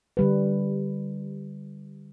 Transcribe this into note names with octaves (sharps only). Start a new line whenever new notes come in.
D3 G3 B4